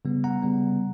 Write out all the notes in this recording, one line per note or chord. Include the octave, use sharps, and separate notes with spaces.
C#3 G3 B3
F#5 A#5
C#3 G3 B3